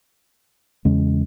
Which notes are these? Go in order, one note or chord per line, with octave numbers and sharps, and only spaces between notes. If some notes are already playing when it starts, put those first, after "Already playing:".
E2 C#3 G#3 C#4